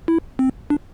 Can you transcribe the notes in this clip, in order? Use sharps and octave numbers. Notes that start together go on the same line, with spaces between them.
E4
C4
D4